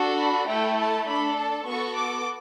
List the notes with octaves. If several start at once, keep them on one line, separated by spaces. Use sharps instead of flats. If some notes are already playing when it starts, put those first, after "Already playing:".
Already playing: D4 F#4 A4
B5
A3 E4 A4 G5
A5
D4 A4 B5
A5
B3 F#4 A4 C#6
D6